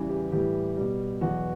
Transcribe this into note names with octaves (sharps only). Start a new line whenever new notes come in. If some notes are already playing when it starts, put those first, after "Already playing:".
Already playing: E2 C#3 E3 G3
G4
A2 E3 G3 G4
B2 G3
E2 B2 F#3 F#4